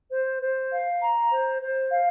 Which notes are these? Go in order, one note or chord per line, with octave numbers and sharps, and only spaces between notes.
C5
C5
F5
A#5
C5
C5
F5